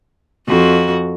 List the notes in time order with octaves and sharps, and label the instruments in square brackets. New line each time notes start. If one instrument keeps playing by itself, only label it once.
[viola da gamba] F2 F#4